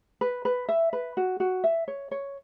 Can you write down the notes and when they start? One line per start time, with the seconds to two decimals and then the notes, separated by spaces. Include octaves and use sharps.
0.21 B4
0.45 B4
0.68 E5
0.93 B4
1.17 F#4
1.40 F#4
1.64 E5
1.88 C#5
2.11 C#5